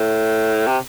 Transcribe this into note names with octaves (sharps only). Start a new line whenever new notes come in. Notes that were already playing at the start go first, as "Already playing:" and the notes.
Already playing: A2
C3